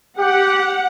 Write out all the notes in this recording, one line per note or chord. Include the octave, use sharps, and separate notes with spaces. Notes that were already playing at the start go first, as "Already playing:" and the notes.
G4 F#5